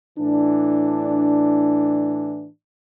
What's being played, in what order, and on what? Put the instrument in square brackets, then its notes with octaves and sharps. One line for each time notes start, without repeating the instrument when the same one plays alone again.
[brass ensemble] A2 E3 D4